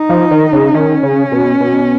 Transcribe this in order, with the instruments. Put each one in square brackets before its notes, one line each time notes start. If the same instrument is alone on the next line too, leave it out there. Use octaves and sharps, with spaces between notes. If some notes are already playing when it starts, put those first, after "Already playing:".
Already playing: [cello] D#4
[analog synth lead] F3
D#3
C#3
[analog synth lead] D#3 [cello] C#4
[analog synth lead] C#3
B2
B2